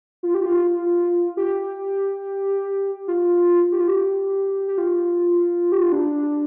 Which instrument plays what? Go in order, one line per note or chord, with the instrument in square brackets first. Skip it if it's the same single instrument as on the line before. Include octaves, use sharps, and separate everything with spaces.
[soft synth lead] F4
G4
F4
G4
F4
G4
F4
G4
G4
F4
G4
F4
D4